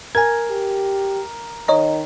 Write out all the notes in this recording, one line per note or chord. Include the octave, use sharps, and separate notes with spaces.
A#4 G#5 G#6
G4
D#3 C#5 D#5 A#5